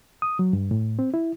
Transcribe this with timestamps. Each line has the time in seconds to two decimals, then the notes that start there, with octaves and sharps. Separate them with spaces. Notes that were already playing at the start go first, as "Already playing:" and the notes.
0.22 D#6
0.39 F#3
0.53 G2
0.71 A2
0.99 C4
1.14 E4